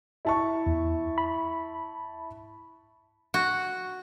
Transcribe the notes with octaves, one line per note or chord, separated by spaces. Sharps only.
E4 A5 C#6
E2
B5
F#4